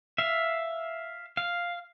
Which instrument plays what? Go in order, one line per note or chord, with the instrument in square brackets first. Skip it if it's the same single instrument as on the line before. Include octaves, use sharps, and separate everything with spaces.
[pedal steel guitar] E5 F5
F5